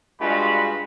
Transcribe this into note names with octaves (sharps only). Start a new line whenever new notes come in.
G2 G3 G#3 F4 F#4 B5